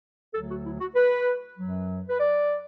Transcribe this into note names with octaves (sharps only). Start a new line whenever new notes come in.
D2 D3 F#3 A4
F#4
E4
F#4
B4
F#2 F#3
B4
D5